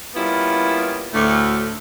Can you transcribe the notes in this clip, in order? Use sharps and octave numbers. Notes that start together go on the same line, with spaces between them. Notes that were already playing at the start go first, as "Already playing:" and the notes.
G3 A#3 B3 C#4 E4 F4
D2 A2 A3